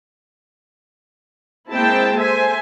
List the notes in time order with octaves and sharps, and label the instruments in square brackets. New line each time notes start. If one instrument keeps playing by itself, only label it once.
[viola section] G#3 A#3 C4 E4 G5 A5
A4 C5 E5 G#5